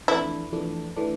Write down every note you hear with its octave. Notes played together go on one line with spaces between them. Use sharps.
F2 E3 A3 D4 E4
F2 E3 A3 D4
E3 A3 D4